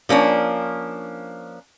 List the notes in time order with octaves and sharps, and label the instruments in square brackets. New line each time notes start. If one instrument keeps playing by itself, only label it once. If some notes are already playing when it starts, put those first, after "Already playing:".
[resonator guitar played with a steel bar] F3 A#3 C#4 D4